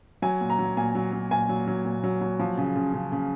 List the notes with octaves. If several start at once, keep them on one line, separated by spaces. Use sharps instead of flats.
F#3 G#5
A#2
A#5
F#3
A#2 G#5
F#3
F#3
A#2 G#5
F#3
F#3
A#2
F#3
F#3
F3
C#3
C#3
C#3
C#3